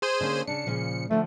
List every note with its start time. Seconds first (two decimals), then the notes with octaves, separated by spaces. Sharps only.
0.02 G#4 C5 G#5
0.21 D3 A#3 C#4
0.48 C#3 D4 C#7
0.66 A#2 C#3 F3
1.11 D3 F3 A3